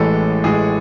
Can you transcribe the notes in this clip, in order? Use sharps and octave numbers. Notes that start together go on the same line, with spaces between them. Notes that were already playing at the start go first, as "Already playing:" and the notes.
Already playing: A1 A2 E3 G#3 A4
A1 A2 E3 G#3 G#4